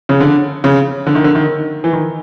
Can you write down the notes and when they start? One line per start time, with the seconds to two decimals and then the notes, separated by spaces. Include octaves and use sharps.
0.09 C#3
0.21 D3
0.64 C#3
1.07 D3
1.15 D#3
1.24 D3
1.35 D#3
1.84 E3
1.93 D#3